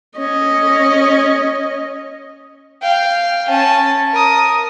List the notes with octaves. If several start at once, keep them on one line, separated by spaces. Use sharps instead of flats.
C#4 D#5
F5 G5
C#4 A5
A#4 D#6